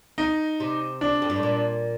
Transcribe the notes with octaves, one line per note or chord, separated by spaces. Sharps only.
D#4
C3
D4
F2
G2
A2
A#2